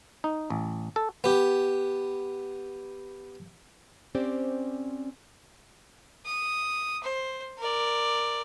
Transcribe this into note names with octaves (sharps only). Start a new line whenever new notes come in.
D#4
A1
A4
B3 G4
C4 C#4 G4 C5 D5
D#6
C5
A#4 D5